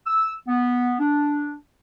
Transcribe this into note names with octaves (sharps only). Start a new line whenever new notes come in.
E6
B3
D4